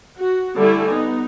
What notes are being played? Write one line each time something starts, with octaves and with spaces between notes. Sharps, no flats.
F#4
D3 G3 A3 E4 G#5
B3 D#4